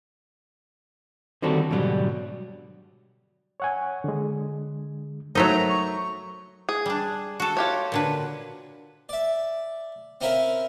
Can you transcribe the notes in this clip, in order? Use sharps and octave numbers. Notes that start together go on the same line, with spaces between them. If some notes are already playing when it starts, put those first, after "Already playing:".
D3 D#3 G3 C4 F#4 A4
G#2 B2 D3 F#3 G3
C#5 F#5 G#5
D3 G#3
F#3 A3 D#4 A#4 C5 A#5
C#6
G#4
G3 D4
F#4 A4
F4 G4 C#5
A#2 D3 B4
D5 E5
C4 C#4 E4 A#4 E5 F5